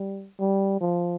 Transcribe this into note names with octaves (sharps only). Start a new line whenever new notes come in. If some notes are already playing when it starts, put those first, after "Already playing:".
Already playing: G3
G3
F3